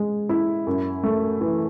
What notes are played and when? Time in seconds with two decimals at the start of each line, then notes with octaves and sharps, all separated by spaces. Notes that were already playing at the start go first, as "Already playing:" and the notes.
Already playing: G#3
0.29 E4
0.67 F#2
1.03 A3
1.41 E3